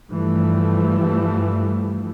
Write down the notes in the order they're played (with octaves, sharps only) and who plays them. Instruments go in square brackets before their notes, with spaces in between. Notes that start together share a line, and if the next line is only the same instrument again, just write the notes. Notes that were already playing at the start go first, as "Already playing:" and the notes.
[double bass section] G2 E3 F3 G3 A3